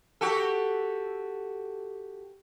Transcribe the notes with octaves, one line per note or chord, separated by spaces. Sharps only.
F#4 G4 A4